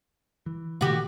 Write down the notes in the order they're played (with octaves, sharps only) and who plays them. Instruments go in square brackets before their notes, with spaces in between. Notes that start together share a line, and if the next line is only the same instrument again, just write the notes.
[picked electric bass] E3
[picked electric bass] A#2 D#3 A3 [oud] F#4 G4